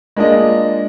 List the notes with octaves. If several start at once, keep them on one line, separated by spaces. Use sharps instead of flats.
G#3 A#3 D4 F4 D#5